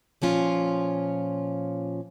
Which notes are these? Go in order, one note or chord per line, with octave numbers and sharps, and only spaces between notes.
A#2 F3 C#4 F4